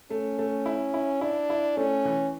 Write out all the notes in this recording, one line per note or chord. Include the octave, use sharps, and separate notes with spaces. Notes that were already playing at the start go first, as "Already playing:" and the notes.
A3 C#4
A3
E4
E4
D4 E4
E4
A3 C#4
E3